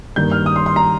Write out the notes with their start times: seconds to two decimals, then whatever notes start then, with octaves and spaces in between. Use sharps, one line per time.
0.16 G2 D#3 A#3 G6
0.32 F6
0.46 D#6
0.56 C6
0.66 C6
0.76 A#5